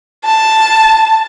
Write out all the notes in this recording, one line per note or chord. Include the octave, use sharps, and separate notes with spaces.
A5